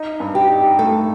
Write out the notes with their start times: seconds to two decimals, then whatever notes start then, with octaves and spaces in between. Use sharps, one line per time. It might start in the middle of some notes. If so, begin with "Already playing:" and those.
Already playing: D#4
0.20 G2
0.35 G4
0.50 D#4
0.79 A3 A4